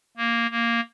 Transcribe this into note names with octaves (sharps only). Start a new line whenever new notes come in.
A#3
A#3